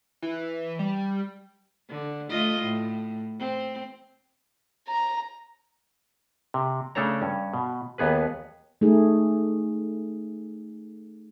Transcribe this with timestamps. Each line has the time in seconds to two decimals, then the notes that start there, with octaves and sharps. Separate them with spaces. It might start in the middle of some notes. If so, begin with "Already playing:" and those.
0.22 E3
0.79 G3
1.89 D3
2.30 A3 F4 D#5
2.61 A2
3.39 C4
4.88 A#5
6.54 C3
6.95 C#3 A3 D4 A4 C#5 A#5
7.21 G2 C#4
7.54 B2
7.98 D#2 B3 G#4 B4
8.81 A3 D#4 G#4